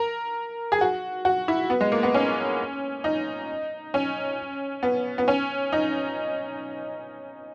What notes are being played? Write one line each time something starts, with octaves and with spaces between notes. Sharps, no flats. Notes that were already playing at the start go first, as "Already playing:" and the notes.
Already playing: A#4
G#4
F#4
F#4
E4
B3
G#3
A#3
B3
C#4
D#4
C#4
B3
B3
C#4
D#4